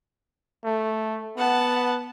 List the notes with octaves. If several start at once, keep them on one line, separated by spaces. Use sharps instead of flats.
A3
B3 F#5 A5